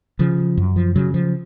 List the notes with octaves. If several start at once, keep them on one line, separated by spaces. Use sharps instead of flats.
C#3 F3
F#2
F3
C#3 F#3
F3